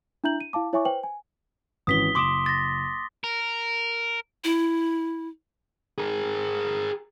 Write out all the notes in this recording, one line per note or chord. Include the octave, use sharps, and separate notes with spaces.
D4 E4 E5 A#5 G6 F#7
D#7
E4 F5 A5 D6
E4 C#5 E5 G#5 C#6 D6
B4 C5 G5 F#7
G#5
G#1 E3 C#4 D#6 B6 G7
F#1 C6 D6 D#6 D7 E7
A6 A#6
A#4
E4
G#4 A#4